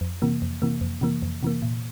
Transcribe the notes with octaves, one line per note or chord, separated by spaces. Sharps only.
F2
C3 E3 A#3
F2
C3 E3 A#3
F2
C3 E3 A#3
F2
C3 E3 A#3
A#2